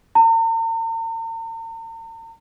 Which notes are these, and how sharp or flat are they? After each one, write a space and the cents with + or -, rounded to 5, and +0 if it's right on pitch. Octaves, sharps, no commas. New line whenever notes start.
A#5 -45